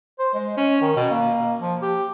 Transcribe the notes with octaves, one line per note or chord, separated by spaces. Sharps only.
C5
G#3
C#4
D#3
B2
A#3
F3
G4